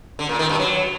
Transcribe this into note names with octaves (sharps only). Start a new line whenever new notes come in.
D3
A#2
D#3
G2
F#3